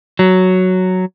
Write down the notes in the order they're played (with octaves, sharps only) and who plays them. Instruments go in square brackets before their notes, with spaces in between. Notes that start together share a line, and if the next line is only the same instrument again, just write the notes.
[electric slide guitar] F#3